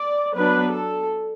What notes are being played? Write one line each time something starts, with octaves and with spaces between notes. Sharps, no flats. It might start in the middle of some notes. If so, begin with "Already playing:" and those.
Already playing: D5
F#3 B3 D4 B4
A4